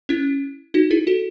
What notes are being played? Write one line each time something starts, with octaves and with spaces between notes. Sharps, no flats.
C#4 E4
D#4 F#4
E4 G#4
F#4 A4